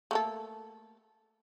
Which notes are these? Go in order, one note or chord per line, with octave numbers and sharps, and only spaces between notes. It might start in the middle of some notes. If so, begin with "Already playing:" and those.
A3 A#3 A4